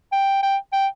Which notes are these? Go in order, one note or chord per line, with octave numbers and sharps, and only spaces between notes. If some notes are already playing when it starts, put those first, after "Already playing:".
G5
G5
G5